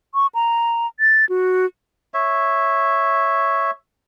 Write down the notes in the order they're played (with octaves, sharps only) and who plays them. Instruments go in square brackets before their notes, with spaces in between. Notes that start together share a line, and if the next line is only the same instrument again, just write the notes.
[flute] C#6
A#5
A6
F#4
[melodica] C#5 E5